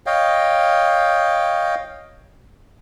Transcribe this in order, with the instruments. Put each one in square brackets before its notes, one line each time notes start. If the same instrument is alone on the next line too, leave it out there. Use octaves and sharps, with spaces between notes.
[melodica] C#5 D#5 F5 G5